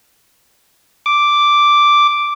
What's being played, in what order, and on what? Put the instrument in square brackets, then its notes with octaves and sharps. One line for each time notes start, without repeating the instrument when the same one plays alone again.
[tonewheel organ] D6